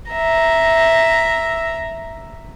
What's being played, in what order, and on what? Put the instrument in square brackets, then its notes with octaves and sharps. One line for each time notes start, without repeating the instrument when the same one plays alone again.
[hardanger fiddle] E5 A#5